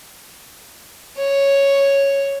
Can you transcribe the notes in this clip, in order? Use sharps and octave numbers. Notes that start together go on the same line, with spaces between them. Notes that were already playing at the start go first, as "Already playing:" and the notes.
C#5